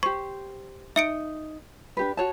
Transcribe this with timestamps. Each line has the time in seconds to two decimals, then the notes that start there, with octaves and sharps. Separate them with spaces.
0.03 G4 C5 C#6
0.96 D#4 E5 C#7 D7
1.97 D4 G4 B4
2.17 F#4 C#5 A5